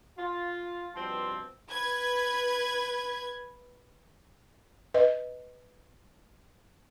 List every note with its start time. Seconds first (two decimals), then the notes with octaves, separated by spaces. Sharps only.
0.18 F4
0.95 G2 B2 F3 C4 A5 C6
1.69 B4 G#6
4.94 B4 D#5